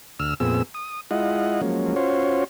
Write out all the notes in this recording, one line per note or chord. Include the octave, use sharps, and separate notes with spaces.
D2 E6 F6
F2 A#2 B3 C4 G#4 E6
D#6
G#3 E4 F4 D#5 F#5
F3 F#3 G#3 A#3 C#4
C#4 F4 F#4 C5 C#5